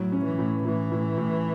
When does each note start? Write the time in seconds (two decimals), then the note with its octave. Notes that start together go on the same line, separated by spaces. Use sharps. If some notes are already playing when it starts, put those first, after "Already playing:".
Already playing: A2 F#3
0.12 C#4
0.25 E3
0.39 A2
0.65 A2 E3
0.92 A2
1.18 A2